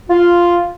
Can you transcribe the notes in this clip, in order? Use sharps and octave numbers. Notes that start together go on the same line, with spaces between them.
F4